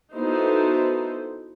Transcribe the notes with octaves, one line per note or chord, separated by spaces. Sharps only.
B3 D#4 E4 F#4 A4 C5